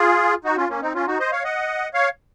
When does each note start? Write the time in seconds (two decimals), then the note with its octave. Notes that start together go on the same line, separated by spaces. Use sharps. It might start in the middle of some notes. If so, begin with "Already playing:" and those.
Already playing: F4 G#4
0.44 D#4 F#4
0.57 C#4 F4
0.69 A#3 C#4
0.82 C4 D#4
0.94 C#4 F4
1.07 D#4 F#4
1.19 C5 D#5
1.32 C#5 F5
1.44 D#5 F#5
1.94 C#5 F5